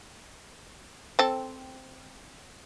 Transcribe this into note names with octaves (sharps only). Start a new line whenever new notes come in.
C4 A4